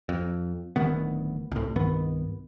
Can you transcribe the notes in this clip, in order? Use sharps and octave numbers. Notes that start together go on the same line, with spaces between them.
F2
D1 D2 D#3 B3
C2 A2
C2 G2 D#3 B3